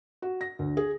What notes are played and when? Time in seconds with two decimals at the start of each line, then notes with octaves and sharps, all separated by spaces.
0.22 F#4
0.41 A#6
0.59 D2
0.77 G#4